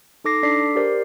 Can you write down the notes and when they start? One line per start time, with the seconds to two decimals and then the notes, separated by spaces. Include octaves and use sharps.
0.24 D#4 A4 D6 A#6 C7
0.43 D4 A4 D5 D6 B6 C7
0.76 G4 A#4 C5 D5 C7